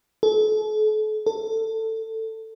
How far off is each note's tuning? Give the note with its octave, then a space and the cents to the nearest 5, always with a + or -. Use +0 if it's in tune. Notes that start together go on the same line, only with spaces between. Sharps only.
A4 -40
A4 +20